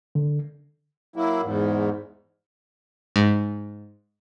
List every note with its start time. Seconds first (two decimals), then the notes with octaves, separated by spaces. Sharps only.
0.15 D3
1.16 F#3 A#3 E4
1.43 E2 G#2
3.16 G#2